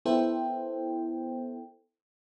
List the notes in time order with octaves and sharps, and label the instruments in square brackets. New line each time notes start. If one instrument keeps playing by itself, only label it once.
[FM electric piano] B3 E4 A4 C5 G5